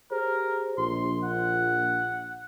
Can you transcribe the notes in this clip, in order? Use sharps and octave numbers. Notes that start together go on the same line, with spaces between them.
G4 G#4 A#4 C5
A#1 C6
F#5